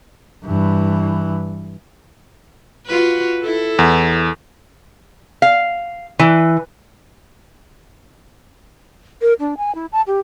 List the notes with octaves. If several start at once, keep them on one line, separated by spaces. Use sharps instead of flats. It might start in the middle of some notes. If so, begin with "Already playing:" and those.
G2 E3
F4 F#4 B4
E4 A4
E2
F5
E3
A#4
D4
G#5
E4
A5
G4